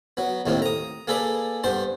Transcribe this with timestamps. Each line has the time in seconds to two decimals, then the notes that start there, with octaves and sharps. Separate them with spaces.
0.17 F#3 B3
0.46 D#2 A2 D#3 A#3 C4
0.62 A#5 D#6
1.08 A#3 G#4 A4 B4 D5
1.64 G2 B3 C5 A5